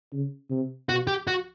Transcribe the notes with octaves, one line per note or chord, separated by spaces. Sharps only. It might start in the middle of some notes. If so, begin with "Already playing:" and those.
C#3
C3
B2 F#4
G4
F#4